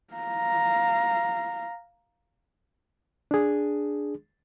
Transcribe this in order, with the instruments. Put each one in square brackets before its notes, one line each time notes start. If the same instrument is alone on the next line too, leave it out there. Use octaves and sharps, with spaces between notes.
[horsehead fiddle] F5 A#5
[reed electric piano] D4 G#4